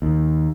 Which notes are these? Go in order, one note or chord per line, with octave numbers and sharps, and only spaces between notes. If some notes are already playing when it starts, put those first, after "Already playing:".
D#2